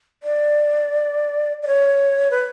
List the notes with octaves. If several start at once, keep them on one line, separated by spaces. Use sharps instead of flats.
D5
D5
C#5
B4